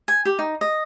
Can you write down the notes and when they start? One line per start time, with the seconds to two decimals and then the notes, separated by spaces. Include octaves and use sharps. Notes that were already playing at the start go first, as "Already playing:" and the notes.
0.08 G#5
0.25 G4
0.39 D#4
0.61 D#5